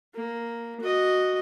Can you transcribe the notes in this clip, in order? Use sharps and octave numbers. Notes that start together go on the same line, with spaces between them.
A#3
F#4 D#5